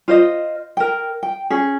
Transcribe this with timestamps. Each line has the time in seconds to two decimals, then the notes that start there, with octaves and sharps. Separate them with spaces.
0.08 F4 C5 D#5
0.77 A#4 G5
1.23 G5
1.50 C#4 G#4